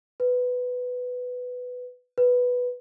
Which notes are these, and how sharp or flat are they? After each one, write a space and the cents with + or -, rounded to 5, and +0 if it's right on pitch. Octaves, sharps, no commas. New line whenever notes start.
B4 +10
B4 +0